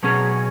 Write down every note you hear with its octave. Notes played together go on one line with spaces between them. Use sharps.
B2 F#3 C#4 G#4